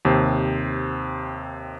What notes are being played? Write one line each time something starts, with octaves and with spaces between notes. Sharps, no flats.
D#2 C3 C5